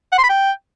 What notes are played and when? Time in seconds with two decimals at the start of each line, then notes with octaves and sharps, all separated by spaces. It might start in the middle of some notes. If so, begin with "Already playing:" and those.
0.12 F#5
0.18 C6
0.24 B5
0.29 G5